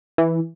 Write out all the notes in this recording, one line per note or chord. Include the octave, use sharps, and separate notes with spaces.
E3